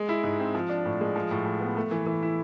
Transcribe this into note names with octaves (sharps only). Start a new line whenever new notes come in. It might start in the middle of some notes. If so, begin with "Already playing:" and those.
Already playing: G#3
E4
G#2
C4
F3
D4
A2
G#3
F3
A2
A2
B3
A3
E3
E3
E4